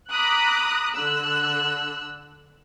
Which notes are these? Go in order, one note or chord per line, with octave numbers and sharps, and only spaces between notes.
A#5 B5 D6 D#6 F#6
D3 E6 F#6